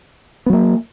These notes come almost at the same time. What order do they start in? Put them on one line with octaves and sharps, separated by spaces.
B3 F#3 A#3